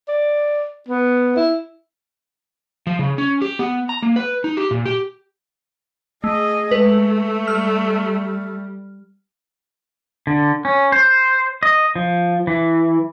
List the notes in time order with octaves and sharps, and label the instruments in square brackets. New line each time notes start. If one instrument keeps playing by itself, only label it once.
[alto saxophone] D5
B3
E4
[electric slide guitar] F3
C#3
C#4
G4
B3
A#5
A#3
B4
D#4
G4
A#2
G4
[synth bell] A3 [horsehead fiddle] G#4 D#5
[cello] G#3 [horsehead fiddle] A3 [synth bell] B4
[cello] G3 [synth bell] F6
[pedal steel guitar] D3
C#4
C5
D#5
F3
E3